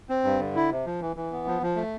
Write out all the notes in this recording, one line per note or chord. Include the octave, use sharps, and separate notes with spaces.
C4
G2
D3
E4
C3
F3
E3
E3
B3
F3
F3
A3